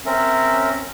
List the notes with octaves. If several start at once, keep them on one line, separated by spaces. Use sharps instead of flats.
C4 C#4 A#4 E5